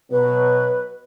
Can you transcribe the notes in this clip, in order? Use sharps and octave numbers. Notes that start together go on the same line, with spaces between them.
B2 F#3 B4